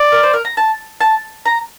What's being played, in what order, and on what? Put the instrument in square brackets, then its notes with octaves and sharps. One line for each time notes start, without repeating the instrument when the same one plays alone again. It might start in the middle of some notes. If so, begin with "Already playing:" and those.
Already playing: [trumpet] D5
[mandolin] A#4
C5
A#4
A#5
A5
A5
A#5